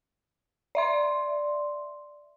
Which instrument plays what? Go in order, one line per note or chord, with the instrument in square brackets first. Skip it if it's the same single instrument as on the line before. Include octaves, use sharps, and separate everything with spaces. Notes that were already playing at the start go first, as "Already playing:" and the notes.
[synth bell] D5 E5 C6